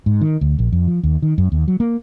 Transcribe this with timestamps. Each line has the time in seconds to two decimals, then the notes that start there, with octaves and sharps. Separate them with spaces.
0.06 G#2
0.21 D#3
0.41 D2
0.59 A#1
0.72 F2
0.87 F3
1.03 D#2
1.22 D#3
1.38 F#2
1.52 D#2
1.68 F#3
1.80 A#3